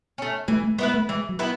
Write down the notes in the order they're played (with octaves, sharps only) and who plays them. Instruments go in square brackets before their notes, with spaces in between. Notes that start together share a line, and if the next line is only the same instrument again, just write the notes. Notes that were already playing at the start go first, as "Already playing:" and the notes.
[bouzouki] A3 C#4
[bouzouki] E3 [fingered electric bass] A3
[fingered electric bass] A3
[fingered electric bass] G#3 [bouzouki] B3 E4 B4
[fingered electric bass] A3
[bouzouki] E3 [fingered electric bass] G#3
[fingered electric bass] F#3
[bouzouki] B3 E4 B4